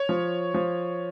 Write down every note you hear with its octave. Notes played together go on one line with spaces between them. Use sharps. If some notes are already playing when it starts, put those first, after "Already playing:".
Already playing: C#5
F3
F3